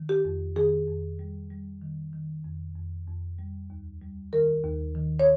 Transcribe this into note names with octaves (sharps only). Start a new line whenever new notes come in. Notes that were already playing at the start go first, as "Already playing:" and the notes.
Already playing: D#3
G4
F2
D#3 G#4
F2
G3
G3
D#3
D#3
F2
F2
F2
G3
D#2
G3
D#3 A#4
D#2
D#3
C#5